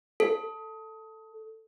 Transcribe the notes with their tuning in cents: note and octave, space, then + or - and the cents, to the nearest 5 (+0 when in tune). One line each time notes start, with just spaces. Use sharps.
A4 +5